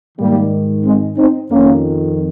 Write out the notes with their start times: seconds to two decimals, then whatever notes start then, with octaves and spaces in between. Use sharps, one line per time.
0.18 G#2 D#3 G3 A#3
0.85 G#3 C4
1.17 C4 D#4
1.50 F2 D#3 A#3 C#4